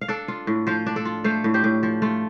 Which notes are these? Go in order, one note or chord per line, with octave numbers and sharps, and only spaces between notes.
F5
D4 A4 D5
F4
A2
F3 C5 F5
D4
A4 D5
F4
A3 C5 F5
A2
G4 C5
A2
F3
A3 F4